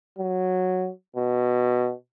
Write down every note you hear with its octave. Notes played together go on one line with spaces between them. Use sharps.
F#3
B2